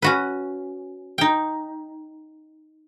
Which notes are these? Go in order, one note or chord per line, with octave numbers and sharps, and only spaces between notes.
C#4 F#4 B4
D#4 G5